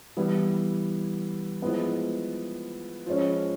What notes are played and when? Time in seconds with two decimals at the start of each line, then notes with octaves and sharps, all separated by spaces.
0.16 E3 G3 B3 E4
1.62 F3 G#3 B3 E4
3.06 F3 G#3 C#4